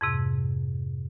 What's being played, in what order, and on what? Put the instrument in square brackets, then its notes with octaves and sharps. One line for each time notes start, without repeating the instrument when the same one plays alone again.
[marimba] F2 G#2 C3